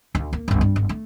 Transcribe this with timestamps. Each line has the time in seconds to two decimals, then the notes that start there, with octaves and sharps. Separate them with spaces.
0.15 D2
0.33 A#3
0.48 G1 C#2
0.61 G2
0.76 G1
0.89 A3